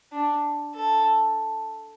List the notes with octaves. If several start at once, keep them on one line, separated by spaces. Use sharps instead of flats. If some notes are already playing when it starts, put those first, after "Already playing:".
D4
A4